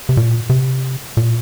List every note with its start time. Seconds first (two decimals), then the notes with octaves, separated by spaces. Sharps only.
0.09 C3
0.17 A#2
0.50 C3
1.17 A#2